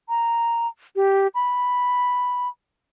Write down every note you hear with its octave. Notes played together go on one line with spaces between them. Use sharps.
A#5
G4
B5